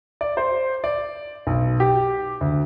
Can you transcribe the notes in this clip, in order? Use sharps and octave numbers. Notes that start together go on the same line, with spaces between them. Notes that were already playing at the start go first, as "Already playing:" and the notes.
D5
C5
D5
B1
G4
D2